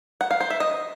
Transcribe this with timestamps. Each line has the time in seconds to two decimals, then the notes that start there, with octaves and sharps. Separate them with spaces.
0.21 F#5
0.31 F5
0.41 C5
0.50 E5
0.60 D#5